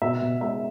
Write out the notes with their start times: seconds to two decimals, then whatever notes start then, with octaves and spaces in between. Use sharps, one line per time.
0.02 B2 E5
0.21 B2
0.41 G#3 E5